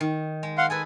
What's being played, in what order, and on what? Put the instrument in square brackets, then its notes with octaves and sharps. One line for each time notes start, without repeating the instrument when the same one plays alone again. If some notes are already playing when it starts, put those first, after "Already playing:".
[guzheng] D#3
G#3
[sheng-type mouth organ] F5 F#5 C6
[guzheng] G#4 A4 B4 [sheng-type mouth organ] G#5